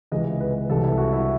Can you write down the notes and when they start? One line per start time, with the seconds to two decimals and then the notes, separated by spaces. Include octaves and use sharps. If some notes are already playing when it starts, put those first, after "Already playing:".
0.12 C#2 C3 E3 G#3 D#5
0.40 B4
0.69 C2 C3 E3 G3 A4
0.84 E4
0.98 F#4
1.13 E4